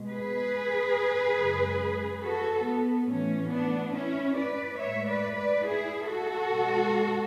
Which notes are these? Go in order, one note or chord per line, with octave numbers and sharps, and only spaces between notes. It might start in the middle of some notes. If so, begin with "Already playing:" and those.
Already playing: B2 G#3
G#4 B4
F#2 C#3 G#3
F#4 A4
B3
A2 E3 A3 C#4
B3 D4
C#4 E4
B4 D5
A2 G#3 C#5 E5
B4 D5
B4 D5
E4 G#4
F#4 A4
B2 G#3